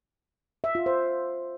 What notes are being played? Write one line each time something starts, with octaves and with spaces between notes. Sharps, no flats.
E5
F4
C5